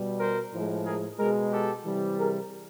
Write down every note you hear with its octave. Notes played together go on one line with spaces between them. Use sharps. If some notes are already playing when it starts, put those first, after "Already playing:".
Already playing: B2 G3
A#4 C5
A2 F3 G#3
G#4 A#4
B2 G#3 G#4 A#4
G4 A4
C3 E3 G3
G#4 A#4